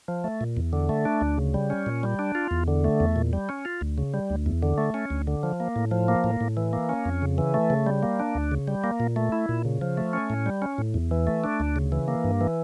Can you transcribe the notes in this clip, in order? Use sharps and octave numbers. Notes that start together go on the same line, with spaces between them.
F3
A3
A#2
E2
D3
A3
D4
D2
C#3
G3
C#4
A#2
G3
D4
F4
E2
D3
A3
E2
A#2
G3
C#4
F4
D2
C#3
G3
D2
E2
D3
A3
C#4
D2
D3
F3
A#3
A2
F3
A#3
A2
A2
E3
A#3
C#4
F2
C#3
E3
A3
C#3
G3
A#3
D4
D2
C#3
G3
A#3
A#2
A3
E4
A#2
C#3
F3
A3
C#4
A2
G3
C#4
A2
E2
E3
A3
D4
D2
C#3
E3
A#3
G2
E3